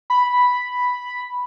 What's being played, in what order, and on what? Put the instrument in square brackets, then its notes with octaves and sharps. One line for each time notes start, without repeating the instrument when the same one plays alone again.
[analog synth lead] B5